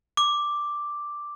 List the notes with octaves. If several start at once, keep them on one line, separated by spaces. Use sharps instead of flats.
D6